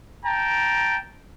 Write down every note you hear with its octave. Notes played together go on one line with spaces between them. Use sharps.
G5 A5 A#5